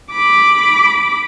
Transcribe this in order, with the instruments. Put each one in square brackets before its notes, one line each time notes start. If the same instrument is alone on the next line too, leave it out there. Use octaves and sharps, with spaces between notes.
[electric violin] B5 D6